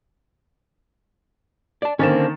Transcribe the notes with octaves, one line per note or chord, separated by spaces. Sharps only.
D5 A5
D3 D#3 A#3 C4 C#4 A4 A6 E7